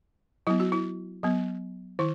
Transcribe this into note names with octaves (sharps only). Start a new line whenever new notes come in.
F#3 B3 E4
F#4
E4
F#3 B3
D#3 E4